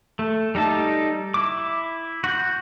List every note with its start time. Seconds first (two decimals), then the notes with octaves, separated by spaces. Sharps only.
0.19 A3
0.55 G3 D#4 A4 A5
1.34 E4 D6
2.24 F#4 G6